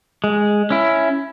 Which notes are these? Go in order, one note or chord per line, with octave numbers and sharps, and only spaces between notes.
G#3
C#4 E4